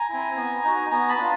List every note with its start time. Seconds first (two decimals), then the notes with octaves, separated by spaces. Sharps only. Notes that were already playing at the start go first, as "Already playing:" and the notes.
Already playing: G#5 A#5
0.09 C4 E4
0.37 B3
0.64 D#4 F#4
0.91 B3 G#5 A#5
1.09 A5 B5
1.18 D4 F4